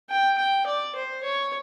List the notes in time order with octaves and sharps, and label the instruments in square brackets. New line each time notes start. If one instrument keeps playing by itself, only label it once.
[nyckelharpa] G5
G5
D5
C5
C#5